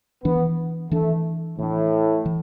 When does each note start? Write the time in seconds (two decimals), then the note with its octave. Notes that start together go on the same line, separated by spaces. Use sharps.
0.24 E3 B3 D4
0.91 E3 A3 D4
1.59 A2 E3 D4
2.26 E3